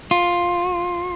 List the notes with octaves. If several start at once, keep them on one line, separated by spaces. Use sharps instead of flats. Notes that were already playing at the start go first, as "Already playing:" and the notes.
F4